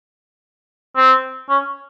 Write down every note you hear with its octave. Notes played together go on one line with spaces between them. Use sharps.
C4
C#4